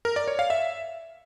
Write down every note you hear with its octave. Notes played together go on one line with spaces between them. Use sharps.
A#4
D5
C#5
F5
E5